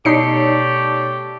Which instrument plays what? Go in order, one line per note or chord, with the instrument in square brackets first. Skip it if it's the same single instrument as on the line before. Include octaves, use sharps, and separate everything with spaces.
[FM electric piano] B2 C#5 D5 [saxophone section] A3 G4 [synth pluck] D#4 C7 C#7